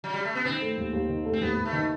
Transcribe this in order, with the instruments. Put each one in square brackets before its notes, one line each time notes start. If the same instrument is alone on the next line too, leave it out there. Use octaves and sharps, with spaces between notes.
[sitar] F#3
G3
A3
B3
[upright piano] D#3 [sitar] C4
[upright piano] A3
D#2
D#2
D#3
A3
[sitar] C4
[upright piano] D#2 [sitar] B3
[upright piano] D#2
[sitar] A3
[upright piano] D#3